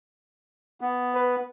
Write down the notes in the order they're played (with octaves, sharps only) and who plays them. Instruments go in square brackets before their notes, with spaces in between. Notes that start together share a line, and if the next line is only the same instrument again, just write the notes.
[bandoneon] B3
[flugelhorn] B4